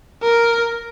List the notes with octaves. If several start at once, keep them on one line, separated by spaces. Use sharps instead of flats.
A#4